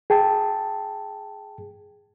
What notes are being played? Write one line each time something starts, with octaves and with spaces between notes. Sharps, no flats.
G#4 G5 A5